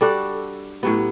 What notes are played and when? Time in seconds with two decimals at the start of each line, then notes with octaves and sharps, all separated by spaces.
0.01 G3 D4 F#4 A4
0.83 A2 F#3 B3 G4